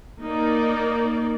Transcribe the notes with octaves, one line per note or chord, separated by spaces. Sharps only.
A#3 D#4 D5